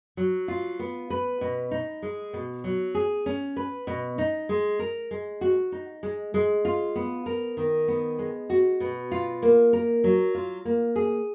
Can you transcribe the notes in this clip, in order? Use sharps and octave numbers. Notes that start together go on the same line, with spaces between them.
F#3
F4
B3
B4
B2
D#4
G#3
B2
F#3
G#4
C#4
B4
B2
D#4
G#3
A#4
G#3
F#4
D#4
G#3
G#3
F4
B3
A#4
D#3
B3
G#3
F#4
B2
F4
A#3
A#4
F#3
F4
A#3
G#4